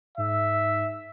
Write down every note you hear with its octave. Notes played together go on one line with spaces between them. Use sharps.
G#2 E5